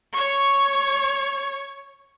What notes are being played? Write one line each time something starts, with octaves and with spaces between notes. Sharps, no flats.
C#5 C#6